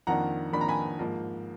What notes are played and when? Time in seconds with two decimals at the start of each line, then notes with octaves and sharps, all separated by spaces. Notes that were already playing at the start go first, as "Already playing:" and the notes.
0.07 F2 D#3 A#3 D4 F#5 A#5
0.53 F2 D#3 A#3 D4 B5
0.61 A#5
0.68 G#5 B5
0.99 G#2 F3 A#3